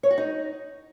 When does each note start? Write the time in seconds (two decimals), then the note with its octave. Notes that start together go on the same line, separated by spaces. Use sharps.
0.03 C#5
0.10 F#4
0.18 D#4